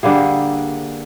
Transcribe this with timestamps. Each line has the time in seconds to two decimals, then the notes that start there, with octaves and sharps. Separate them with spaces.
0.03 D3 G3 A#3 G#4